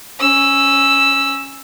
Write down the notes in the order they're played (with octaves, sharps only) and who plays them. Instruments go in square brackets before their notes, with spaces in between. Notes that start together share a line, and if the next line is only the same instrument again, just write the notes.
[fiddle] C#4 E6